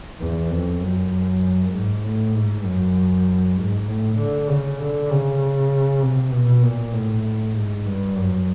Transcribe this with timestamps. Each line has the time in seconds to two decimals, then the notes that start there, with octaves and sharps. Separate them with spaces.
0.20 E2
0.50 F2
0.81 F#2
1.73 G#2
2.04 A2
2.35 G#2
2.65 F#2
3.57 G#2
3.87 A2
4.18 D3
4.48 C#3
4.79 D3
5.09 C#3
6.02 C3
6.32 B2
6.63 A#2
6.93 A2
7.54 G#2
7.85 G2
8.16 F#2